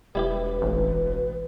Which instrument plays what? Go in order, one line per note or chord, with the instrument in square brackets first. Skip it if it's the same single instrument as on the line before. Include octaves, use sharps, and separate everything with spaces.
[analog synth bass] E1 [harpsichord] G3 E4 G4 [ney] B4
[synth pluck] A1